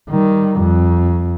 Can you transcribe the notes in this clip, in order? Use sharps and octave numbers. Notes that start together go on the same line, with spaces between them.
D#3 G3
F2